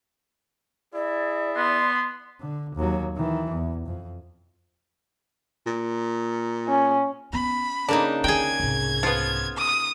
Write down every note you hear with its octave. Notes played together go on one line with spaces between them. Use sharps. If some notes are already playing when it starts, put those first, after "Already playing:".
E4 G#4 D5
B3 C6
D3
D#2 F#3
D#3 E3
E2
F2
A#2
C#4
B3 C#4 B5
C#3 A#3 D4 D#4
D3 G#4 G5 G#6
C2 G#2
F3 B3 F4
D#6